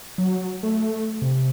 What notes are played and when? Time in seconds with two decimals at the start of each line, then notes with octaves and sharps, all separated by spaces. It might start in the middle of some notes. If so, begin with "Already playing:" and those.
0.18 F#3
0.63 A3
1.22 C3